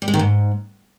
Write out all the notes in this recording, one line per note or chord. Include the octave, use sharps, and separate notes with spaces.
G3
G#3
D#3
G#2